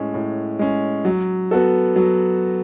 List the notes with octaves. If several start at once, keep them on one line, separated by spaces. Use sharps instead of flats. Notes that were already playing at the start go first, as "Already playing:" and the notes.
Already playing: A2 G#3 C#4
A2
G#3 C#4
F#3
B3 F#4 A4
F#3